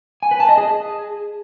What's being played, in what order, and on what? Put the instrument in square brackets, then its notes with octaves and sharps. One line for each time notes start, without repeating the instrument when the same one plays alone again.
[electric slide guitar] G#5
B4
A5
D#5
G#4